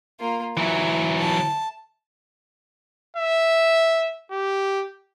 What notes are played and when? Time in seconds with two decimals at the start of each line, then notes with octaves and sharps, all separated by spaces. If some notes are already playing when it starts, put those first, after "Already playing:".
0.20 A#3 F4
0.57 E3 F#3 E5
1.18 A5
3.17 E5
4.31 G4